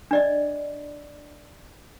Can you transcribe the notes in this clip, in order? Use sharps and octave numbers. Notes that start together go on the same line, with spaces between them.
D4 D5 D#5